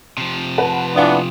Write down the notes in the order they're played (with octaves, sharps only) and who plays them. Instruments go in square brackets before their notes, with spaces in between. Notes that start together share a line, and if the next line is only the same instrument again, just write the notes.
[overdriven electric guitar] C3 F3
[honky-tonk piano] B4 F#5 A5
[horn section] E3 B3 D4 [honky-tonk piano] F4 F5 D#6